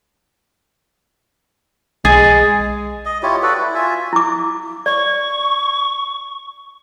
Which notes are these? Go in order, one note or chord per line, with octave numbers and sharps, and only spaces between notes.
B1 G#3 G#4 A6
D#5
E4 F4 G4 C#5
F#4 A4 B4 D5
E4
F4 E5 G#5
E4 D6
D5 C#6